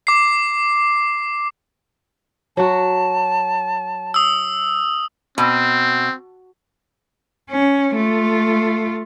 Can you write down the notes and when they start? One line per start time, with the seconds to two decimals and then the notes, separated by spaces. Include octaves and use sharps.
0.07 D6 C7
2.57 F#3 F#4 A5
4.14 D#6 E6
5.38 B2 C4
7.50 C#4
7.95 A3 F4